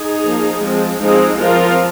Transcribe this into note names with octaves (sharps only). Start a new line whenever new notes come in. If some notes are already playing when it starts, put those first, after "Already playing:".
Already playing: D#4 G#4
F3 A#3
F3 G#3 C4
F3 G#3 C4 D#4 G#4
F3 C4 F4 A#4